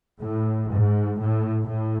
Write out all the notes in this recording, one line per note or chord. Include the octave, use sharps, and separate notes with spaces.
A2
G#2
A2
A2